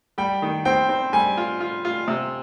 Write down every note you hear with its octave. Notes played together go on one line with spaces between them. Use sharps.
G3 G5
D#3
C4 G5
C4
G3 G#5
F4
F4
F4
C3